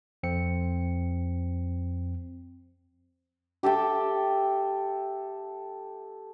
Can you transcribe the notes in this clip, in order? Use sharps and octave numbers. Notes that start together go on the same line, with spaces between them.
F2 C4 C#7
G4 A4 E5 G5